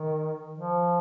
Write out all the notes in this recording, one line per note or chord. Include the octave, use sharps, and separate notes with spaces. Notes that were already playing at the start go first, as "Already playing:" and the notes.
Already playing: D#3
F3